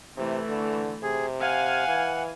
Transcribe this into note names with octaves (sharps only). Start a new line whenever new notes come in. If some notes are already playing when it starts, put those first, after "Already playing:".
C3 E3 A3
D3
C3 G#4
F5 F#5 G#5
E3